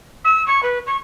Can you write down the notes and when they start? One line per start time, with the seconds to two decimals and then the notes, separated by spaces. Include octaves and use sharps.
0.24 E6
0.46 C#6
0.63 B4
0.86 C#6